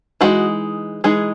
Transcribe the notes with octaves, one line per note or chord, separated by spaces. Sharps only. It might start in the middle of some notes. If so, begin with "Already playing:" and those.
E3 G#3 D#4 F#4
E3 G#3 D#4 G#4